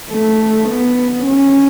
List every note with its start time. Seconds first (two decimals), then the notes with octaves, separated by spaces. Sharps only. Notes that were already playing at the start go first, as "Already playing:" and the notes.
0.10 A3
0.69 B3
1.26 C#4